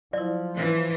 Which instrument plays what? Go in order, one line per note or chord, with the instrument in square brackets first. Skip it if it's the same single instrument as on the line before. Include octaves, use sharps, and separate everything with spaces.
[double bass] F3 [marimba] F#3 E4 [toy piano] D5
[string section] E3